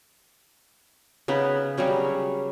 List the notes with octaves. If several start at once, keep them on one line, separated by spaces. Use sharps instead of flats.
C#3 B3 D#4 B4
C#3 F#3 G3 C#4